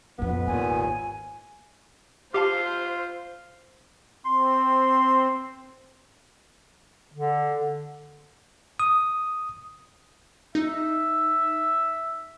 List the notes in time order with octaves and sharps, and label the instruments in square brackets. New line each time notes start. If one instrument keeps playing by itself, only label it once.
[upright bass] A#1 F2 [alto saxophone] B3
[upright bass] G#1 [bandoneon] D#2 A#2 [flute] G#5
[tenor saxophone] F4 [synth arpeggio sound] G4 F5 A5 [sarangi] C5
[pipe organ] C4 [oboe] C6
[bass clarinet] D3
[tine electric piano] D#6
[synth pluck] D#4 [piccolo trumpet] E5